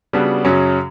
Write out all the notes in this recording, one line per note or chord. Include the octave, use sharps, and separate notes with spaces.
C#3 G3 B3 D4 F#4
F#2 C#3 F#3 C#4